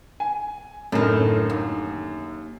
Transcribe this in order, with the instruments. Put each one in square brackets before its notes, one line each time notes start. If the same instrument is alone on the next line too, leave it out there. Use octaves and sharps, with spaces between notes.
[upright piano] G#5
[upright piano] F#2 D3 [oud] A2 D#3
[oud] D#2